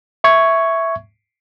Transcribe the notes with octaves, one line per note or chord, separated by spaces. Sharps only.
E5 C#6 G#6